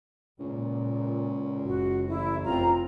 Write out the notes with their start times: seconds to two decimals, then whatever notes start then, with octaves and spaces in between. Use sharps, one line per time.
0.40 C#2 A#2
1.65 F#1 F#4
2.08 A1 E4
2.44 F1 C4 F4 A#5